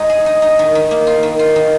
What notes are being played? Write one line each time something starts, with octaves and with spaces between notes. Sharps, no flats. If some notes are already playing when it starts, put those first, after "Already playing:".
Already playing: G#3 D#4
G#4
D#4
D#4
D#3
D#3
A#3
F4
D#3
F4
D#3